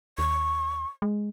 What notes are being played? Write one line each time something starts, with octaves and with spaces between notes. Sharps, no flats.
D#2 C#6
G#3